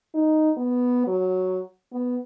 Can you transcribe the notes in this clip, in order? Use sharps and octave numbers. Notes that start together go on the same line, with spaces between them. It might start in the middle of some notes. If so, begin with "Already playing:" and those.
D#4
B3
F#3
B3